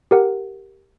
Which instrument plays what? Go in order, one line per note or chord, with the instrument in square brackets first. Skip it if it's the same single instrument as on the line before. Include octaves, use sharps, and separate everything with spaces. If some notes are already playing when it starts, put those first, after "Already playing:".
[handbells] G4 A#4 F#5